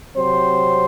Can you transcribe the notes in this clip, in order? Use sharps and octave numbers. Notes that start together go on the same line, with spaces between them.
C3 F#3 C4 C5